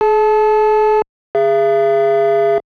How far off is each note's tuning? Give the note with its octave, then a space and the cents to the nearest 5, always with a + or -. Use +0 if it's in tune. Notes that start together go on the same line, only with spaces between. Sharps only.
G#4 +40 A5 -20
G#4 -20 E5 +40